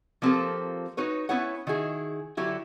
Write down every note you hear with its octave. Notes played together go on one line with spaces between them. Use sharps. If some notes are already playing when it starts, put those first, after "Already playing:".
F3 A#3 C4 F4 G4 A4
D#4 F#4 B4 C#5
B3 C#4 E4 B4 C#5 F#5
D#3 E4 F#4 G#4
D3 F#3 E4 G4